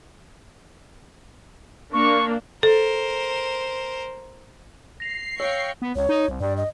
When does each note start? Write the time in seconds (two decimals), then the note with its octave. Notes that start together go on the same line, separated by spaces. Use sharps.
1.93 A#3 D4 C#6
2.63 A4 A#4 C5
5.00 A#6 C7 F7
5.40 C#5 F5 G5 C#6 E6 F#6
5.82 B3
5.96 C#2 C#5
6.09 D#4
6.28 C2
6.41 G2 D5
6.57 D#5